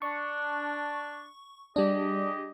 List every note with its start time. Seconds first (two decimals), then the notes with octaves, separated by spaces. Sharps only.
0.02 D4 C#6
1.76 G3 D4 G4 G#4 D#5